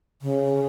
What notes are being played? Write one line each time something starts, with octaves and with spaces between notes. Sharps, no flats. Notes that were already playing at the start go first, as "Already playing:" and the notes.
C#3